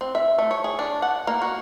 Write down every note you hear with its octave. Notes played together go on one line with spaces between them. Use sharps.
C4
E5
A3
C#5
G#4
D4
F#5
A#3
F#4